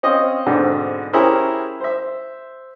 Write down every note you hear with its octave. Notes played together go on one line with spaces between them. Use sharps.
C4 C#4 D#5 F5
G#2 B2 D3 C4 D4
C#4 E4 G4 G#4 A#4 C5
C5 E5